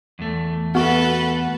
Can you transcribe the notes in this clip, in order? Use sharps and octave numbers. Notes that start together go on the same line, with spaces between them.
E2 A3
B3 F#4 A4 B4 C#6